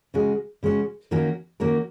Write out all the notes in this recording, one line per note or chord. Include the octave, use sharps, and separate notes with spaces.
C#3 G#3 C#4 F#4
C#3 G#3 C#4 F#4
D#3 A#3 C#4 F#4 A#4
D#3 A#3 C#4 F#4 A#4